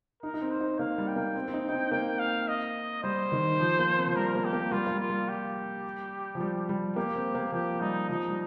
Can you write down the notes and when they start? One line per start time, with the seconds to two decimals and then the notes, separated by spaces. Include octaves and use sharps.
0.23 D#4 A#4
0.34 D#4
0.41 C4
0.51 C5
0.61 D#4
0.79 A#3 F5
0.98 G3
1.08 G5
1.16 A#3
1.35 C4
1.48 C4
1.53 D#4
1.68 D#4
1.73 C4
1.92 A#3 G5
2.19 F5
2.48 D#5
3.04 G3 C5
3.32 D#3
3.60 F3
3.79 A#3
3.97 C4
4.07 F3
4.16 G3 A#4
4.35 A#3
4.45 G4
4.53 A#3
4.72 G3 F4
4.87 A#3
4.91 G3
5.00 F4
5.10 G3
5.29 G4
6.35 F3
6.40 G3
6.69 G3
6.96 A#3 G4
7.15 C4
7.35 A#3
7.52 F3 G4
7.81 G3 D#4
8.09 F3 D#4
8.28 G3